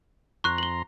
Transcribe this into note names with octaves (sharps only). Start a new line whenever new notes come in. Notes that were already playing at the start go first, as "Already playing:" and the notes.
F2 A#5 C6 C#6 F#6
F#7 G7